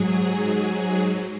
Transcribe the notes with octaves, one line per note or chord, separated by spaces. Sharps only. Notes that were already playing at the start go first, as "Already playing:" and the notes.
Already playing: G#2 F#3 G#4